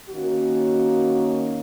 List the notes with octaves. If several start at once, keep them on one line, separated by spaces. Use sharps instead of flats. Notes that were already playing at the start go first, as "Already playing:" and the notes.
D#3 A#3 C#4 F#4